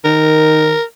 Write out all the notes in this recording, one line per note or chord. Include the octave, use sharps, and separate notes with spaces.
D#3 A#4